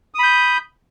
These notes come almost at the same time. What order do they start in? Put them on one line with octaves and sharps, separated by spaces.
D#6 B5 G6